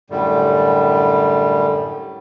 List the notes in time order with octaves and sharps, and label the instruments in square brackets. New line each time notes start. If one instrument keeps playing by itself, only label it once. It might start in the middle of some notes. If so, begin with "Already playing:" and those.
[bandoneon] F#2 A2 D3 G3